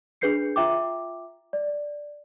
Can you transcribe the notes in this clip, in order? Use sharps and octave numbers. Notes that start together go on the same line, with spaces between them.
D4 G#4 B4 G6 C7 C#7
F4 E5 G5 D6
D5